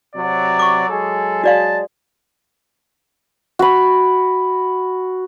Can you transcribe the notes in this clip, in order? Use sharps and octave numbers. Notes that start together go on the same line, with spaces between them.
C3 F#3 D5
C#6 D6
F#3 G#3 G#4 A4
F#4 D5 F5 A5
F#4 B5